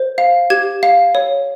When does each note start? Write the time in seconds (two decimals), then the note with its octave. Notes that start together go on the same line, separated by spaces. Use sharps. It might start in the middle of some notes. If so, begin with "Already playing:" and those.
Already playing: C5
0.18 F5
0.50 G4 G#6
0.83 F5
1.15 C#5